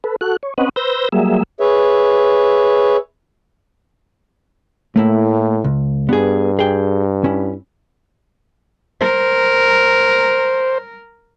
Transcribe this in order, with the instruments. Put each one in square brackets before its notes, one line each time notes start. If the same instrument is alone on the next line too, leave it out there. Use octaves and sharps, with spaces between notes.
[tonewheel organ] A4 B4
F#4 A4 F#6
C#5
C4 C#4 B4 D#5 F#5
B4 C5 E6 G6 A#6
F#3 G3 A#3 G#4 E5
[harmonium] G#4 B4 C#5 E5
[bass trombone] A2 [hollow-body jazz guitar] A3 A#3 E4
[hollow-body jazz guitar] C#2
[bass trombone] G2 [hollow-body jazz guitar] B3 G#4
[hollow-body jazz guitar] G#4 G5
C#4 E4
[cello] A#4 [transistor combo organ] C5